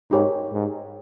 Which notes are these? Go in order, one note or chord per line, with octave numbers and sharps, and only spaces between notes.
G#2 D#4 G4 A#4 C#5
G#2